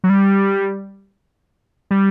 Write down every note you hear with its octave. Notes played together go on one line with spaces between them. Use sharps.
F#3
G3
G3